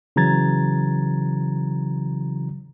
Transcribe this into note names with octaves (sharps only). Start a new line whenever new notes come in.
C#3 E3 F#3 A#5 G#6 A6